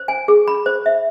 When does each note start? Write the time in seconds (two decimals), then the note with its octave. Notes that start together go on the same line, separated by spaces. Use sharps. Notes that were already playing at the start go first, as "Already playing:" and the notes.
Already playing: C5
0.08 G#5
0.28 G#4
0.48 B5
0.66 C5
0.86 E5